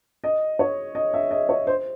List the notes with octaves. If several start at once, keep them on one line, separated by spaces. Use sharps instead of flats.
D#5
C#5
D#5
E5
D#5
C#5
C5